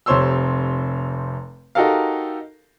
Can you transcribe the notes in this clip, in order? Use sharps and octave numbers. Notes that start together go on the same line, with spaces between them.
F1 C3 C5 C#5 C6 E6
D#4 F#4 G4 A4 A#4 F5